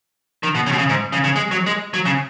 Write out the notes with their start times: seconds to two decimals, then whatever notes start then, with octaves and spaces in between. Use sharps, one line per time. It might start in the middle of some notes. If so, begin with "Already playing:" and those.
0.43 D#3
0.55 B2
0.66 C#3
0.72 B2
0.78 C#3
0.89 G#2
1.12 C#3
1.24 C#3
1.36 G#3
1.51 F#3
1.66 G#3
1.94 F#3
2.05 C#3